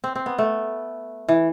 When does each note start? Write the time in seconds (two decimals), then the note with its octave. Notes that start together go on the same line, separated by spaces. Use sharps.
0.04 C4
0.15 C4
0.26 B3
0.38 A3
1.29 E3